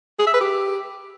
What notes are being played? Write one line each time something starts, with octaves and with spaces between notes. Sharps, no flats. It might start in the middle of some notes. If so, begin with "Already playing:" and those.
G#4
E5
B4
G4